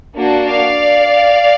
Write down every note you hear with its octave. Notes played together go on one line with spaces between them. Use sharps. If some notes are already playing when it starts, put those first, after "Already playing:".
A#3 D4 F#4
D5 F5